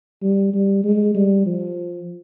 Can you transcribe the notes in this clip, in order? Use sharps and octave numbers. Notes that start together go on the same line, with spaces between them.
G3
G3
G#3
G3
F3